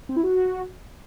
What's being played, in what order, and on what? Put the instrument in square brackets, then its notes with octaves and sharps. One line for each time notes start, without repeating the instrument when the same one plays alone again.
[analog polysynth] C4
E4
F#4